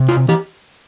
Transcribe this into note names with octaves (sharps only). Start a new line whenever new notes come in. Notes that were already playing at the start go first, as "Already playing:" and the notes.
Already playing: C3
F4
E3 G4